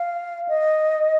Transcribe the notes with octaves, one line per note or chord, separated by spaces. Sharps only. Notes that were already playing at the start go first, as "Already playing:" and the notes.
Already playing: F5
D#5